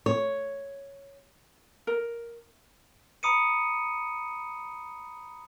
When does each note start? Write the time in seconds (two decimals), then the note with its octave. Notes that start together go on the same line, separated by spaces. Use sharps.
0.06 C#5
1.87 A#4
3.23 A#5 B5 D#6 C#7 D#7